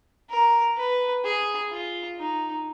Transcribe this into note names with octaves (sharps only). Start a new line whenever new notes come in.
A#4
B4
G#4
F4
D#4